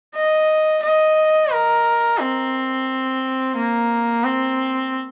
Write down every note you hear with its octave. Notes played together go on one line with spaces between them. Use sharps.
D#5
D#5
A#4
C4
A#3
C4